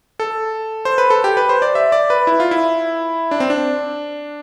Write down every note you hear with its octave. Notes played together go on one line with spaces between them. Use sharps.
A4
C5
B4
A4
G4
B4
C5
D5
E5
D5
B4
E4
F4
E4
D4
C4
D4